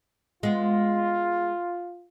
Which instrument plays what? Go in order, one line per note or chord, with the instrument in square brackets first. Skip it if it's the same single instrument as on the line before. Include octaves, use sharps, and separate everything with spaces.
[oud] G#3 B3 [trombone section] F4